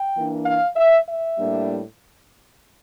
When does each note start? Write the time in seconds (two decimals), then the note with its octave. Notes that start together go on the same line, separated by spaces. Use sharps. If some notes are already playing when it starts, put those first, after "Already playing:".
Already playing: G5
0.14 E3 A#3 D4
0.45 F5
0.76 E5
1.07 E5
1.38 A2 G3 A#3 D4